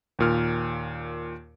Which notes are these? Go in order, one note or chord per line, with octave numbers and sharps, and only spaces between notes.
D#2 A#2 F6